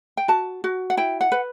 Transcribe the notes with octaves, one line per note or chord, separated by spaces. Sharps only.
G5
F#4 A5
F#4
F#5
E4 G5
F#5
B4